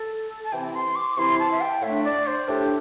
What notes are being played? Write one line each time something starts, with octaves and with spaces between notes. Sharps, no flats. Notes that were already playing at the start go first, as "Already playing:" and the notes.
Already playing: A4
A5
C3 E3 C4 E4 G5
C6
D6
C3 E3 C4 E4 C6
A5
E5
G5
A2 A3 D4 E5
D5
C5
A2 A3 D4 G4